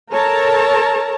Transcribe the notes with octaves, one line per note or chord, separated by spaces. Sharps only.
A4 A#4 C#5 A5 A#5